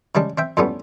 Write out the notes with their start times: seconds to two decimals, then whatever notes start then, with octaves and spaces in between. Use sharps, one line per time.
0.15 C#3 G3 G#3 D4
0.38 C4 E5 G5
0.57 F2 A2 G3 A3 B3 C#4